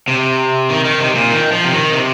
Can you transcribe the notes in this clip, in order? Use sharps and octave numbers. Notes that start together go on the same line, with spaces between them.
C3
D#3
D#3
C3
A#2
D#3
F3
C3
D#3
C3